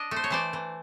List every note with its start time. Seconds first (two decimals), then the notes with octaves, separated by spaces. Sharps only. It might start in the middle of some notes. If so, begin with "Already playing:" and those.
Already playing: D4 D#5
0.11 A3
0.16 C5
0.24 C#5
0.30 E3 C5 D5
0.53 E3